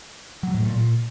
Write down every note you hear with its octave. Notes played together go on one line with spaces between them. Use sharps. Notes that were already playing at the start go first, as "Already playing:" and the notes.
F#3
A2
A#2